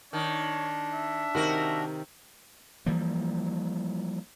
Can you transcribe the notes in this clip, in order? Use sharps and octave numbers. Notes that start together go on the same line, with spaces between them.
D#3 D4 C#5
E5
C3 D#3 D#4 F#4 A#4
E3 F3 G3 A#3